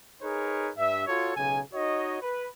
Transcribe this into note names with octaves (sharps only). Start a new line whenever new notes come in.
D#4 G#4 A#4 B4 C#5
G2 E5
F4 F#4 A4 C#5
B1 C#3 G#5
D#4 F#4 C#5 D#5
B4